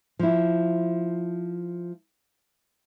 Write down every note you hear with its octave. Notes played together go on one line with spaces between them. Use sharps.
F3 E4